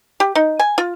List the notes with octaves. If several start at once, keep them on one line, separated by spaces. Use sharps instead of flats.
G4
D#4
G#5
F4